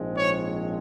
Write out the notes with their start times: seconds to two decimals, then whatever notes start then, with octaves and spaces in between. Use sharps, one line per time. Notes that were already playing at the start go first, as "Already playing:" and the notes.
Already playing: A#1 G#2 F3 G#3 C4
0.16 C#5